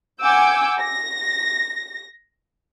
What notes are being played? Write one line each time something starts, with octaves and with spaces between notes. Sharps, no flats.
F#5 G#5 D6 E6 G6
A#6